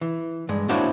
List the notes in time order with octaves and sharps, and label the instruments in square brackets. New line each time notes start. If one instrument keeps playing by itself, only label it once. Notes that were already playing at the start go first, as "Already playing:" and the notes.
[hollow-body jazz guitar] E3
G2 G#3
A#3 D4 E4 F#4 C5 C#5